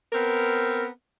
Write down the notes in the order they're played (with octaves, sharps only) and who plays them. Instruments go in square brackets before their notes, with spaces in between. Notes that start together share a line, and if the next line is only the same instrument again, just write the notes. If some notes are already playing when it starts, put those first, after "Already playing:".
[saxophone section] B3 C4 A#4